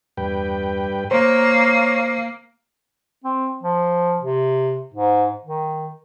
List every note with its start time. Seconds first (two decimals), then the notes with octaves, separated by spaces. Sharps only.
0.17 E2 G2 B4 G5
1.11 A#3 C5 C#5 A#5
3.24 C4
3.63 F3
4.19 C3
4.94 G#2
5.44 D#3